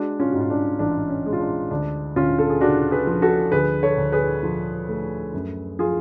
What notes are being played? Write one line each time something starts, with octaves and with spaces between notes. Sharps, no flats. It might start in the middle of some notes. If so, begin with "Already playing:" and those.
Already playing: G#3 D4 F#4
C#4 F4
G#2 F#4
F4
D4
A1 D4
C#4
G#3
F4
D4
D2 D4
D2 C#4 F4
A4
G#4
C#3 D4 F#4
G#4 B4
F3
F#4 A4
D2 G#4 B4
A4 C#5
D2
G#4 B4
F3
A3
F#2
F3 F4 G#4